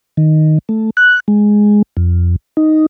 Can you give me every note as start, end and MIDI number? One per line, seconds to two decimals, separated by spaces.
0.17 0.58 51
0.69 0.90 57
0.97 1.20 90
1.28 1.82 56
1.97 2.36 41
2.57 2.86 63